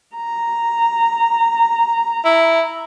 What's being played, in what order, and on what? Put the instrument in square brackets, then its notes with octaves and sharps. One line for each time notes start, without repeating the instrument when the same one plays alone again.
[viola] A#5
[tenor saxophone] E4